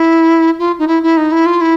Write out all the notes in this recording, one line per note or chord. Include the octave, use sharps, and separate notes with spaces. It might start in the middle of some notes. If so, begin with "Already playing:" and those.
Already playing: E4
F4
D#4
E4
E4
D#4
E4
F4
E4